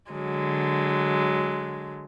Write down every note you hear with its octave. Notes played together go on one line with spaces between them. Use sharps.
D3 F#3 G#3